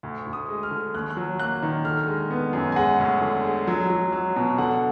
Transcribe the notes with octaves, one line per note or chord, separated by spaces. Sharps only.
D2
D2
D#6
G#3
F6
D3
D#2 F#6
F#6
F#3
A#3 F#6
D#3
D3 F6
G#3
B3
F#2
G#5
G#3 F#5
D2
D3
G#3
F#3
F#3
F#3
B2
D3 F#5